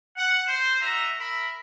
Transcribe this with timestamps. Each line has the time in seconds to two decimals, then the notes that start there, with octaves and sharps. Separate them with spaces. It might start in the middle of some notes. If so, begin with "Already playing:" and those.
0.16 F#5
0.47 C5
0.80 D#4 F#4 E5 A#5
1.18 A#4 E5 B5